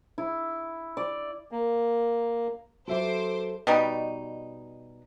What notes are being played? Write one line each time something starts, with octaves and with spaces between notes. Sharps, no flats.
E4
D5
A#3
F#3 A4 B4 C5 E5 D6
B2 G3 D#4